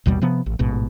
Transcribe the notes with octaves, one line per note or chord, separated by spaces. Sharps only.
A1 D#2 B2 G3
C3 F3 B3
A1
A1 G#2 B2